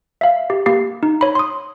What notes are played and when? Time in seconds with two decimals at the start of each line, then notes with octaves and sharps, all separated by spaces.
0.21 E5 F5
0.50 G4
0.66 A#3 G4 C7
1.03 D#4
1.21 C#5 B5
1.35 C6 D#6